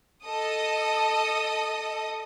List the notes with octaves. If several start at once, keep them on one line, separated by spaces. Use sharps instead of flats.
A4 D#5 D#6